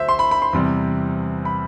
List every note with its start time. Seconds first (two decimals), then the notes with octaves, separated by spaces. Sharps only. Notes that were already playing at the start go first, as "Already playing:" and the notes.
Already playing: D2 F#3 C5 E5
0.09 C6
0.19 B5
0.31 B5
0.42 C6
0.53 E2 C3 G3
1.45 B5